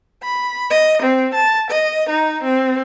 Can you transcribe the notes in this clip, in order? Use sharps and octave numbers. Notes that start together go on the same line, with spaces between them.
B5
D#5
C4
A5
D#5
D#4
C4